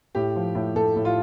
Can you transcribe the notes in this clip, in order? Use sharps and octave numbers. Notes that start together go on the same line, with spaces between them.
A2 G4
F3
A2
A2 A4
A2
F4